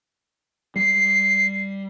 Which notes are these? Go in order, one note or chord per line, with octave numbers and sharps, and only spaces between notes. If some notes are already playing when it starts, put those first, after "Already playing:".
G3 C7